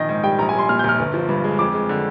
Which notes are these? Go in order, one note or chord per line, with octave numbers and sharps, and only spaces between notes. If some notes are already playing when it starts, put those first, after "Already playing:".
Already playing: A#1 D#3 D#5
G#2
G3 G5
A#1 A#5
G#5
G3 C6
A#2 F6
G6
A#1 F6
G1
F3
G2
G#3
F2 D6
G#3
D3